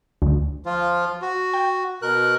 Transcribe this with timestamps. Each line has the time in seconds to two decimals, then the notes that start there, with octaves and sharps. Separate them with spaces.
0.22 D2
0.66 F3 F4
1.22 F#4
1.54 G5
2.02 B2 A#4 F#6